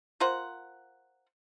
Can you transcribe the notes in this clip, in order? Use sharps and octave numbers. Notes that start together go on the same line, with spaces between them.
F4 A#4 C5 F#5